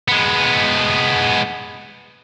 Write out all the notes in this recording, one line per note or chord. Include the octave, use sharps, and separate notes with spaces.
G#3 B3